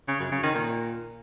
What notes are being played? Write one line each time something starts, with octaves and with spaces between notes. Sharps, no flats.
C#3
F#2
C#3
D#3
A#2